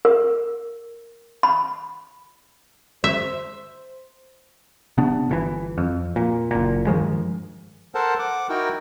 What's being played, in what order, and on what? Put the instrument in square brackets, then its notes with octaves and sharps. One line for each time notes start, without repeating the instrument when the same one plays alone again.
[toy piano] A#4
B5
[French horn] C5 [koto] E5
[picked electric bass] C3 B3 D4
G1 C3 E3
F2
A#2
F#1 A#2
G2 D#3 F3 G#3
[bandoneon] A4 A#4 C5 F#5 A5
F#5 D6
D#4 E4 F#4 A#4 G5